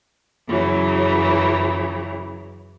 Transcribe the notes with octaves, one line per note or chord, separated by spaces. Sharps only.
F#2 C#3 E3 F#3